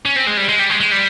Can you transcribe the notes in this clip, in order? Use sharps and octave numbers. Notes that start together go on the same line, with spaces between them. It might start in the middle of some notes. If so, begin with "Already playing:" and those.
C#4
C4
G#3
G3
G#3
G3
G#3
G#3
G3